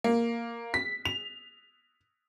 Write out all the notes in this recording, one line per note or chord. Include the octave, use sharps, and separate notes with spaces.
A#3
B6
F7